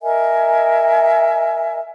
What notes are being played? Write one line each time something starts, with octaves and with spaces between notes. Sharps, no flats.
A#4 D#5 E5 G#5